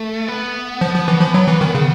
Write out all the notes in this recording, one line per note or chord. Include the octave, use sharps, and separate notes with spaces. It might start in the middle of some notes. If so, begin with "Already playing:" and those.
Already playing: A3
B3
F3
F3
E3
F3
F#3
E3
D#3
C#3